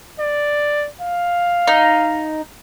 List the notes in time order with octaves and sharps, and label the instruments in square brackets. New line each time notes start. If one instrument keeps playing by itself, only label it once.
[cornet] D5
F5
[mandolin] D#4